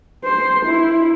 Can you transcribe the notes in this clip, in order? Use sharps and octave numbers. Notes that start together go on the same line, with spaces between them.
C5
E4